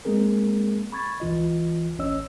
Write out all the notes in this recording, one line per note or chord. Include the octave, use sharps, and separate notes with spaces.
G#3 A#3 C4 G#4 A#4
B5 C#6 G#6 A6
C#2 E3 F4 D#5
A1 C#4 C#5 D#5 E6